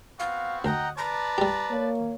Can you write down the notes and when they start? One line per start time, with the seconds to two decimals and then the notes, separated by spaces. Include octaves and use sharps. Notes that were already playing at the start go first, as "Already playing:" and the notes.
0.20 B3 C4 F#4 F5
0.65 D2 D#5 F#5 G5 A#5
0.98 B4 D5 A5 A#5
1.38 G3 G4
1.70 A#3 C#5